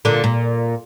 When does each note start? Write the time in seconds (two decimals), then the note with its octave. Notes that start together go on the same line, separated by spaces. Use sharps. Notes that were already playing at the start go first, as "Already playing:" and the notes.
0.05 A#2 D3
0.24 A#2